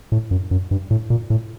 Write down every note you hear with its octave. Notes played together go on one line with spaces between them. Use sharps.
A2
F#2
F#2
G2
A2
A#2
A2